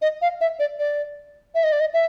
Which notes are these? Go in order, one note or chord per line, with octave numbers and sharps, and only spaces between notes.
D#5
F5
E5
D5
D5
E5
D#5
D5
D#5
E5